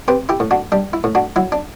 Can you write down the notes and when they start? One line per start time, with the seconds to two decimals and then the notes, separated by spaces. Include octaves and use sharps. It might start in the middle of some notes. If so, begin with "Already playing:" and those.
0.08 C4 G4 B4
0.29 E4 G4
0.40 A2
0.51 D4 F#4
0.72 G3 D4
0.93 E4
1.04 A2
1.15 D4 F#4
1.36 F#3 E4
1.52 D4